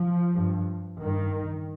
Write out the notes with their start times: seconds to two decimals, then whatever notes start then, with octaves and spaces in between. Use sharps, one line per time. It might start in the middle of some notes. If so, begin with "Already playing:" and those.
Already playing: F3
0.33 G2
0.99 G2 D#3